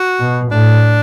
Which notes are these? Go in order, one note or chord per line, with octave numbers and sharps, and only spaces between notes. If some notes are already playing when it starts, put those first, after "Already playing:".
Already playing: F#4
B2
A2 D4